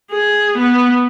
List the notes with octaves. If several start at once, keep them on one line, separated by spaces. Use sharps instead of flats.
G#4
B3